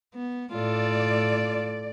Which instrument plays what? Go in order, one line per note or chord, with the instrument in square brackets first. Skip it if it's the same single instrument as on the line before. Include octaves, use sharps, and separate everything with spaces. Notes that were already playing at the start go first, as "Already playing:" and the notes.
[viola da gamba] B3
[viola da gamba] A2 F4 A4 [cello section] D5